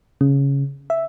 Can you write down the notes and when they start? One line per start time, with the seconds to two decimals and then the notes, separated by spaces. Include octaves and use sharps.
0.21 C#3
0.90 E5